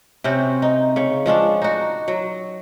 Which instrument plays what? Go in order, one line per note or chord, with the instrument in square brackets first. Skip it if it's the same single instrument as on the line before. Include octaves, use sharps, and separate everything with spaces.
[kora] C3 C4 C#4 F#4
D#4
C#3 C#5
F3 G#3 C#4 D4
D#4 F#4
F#3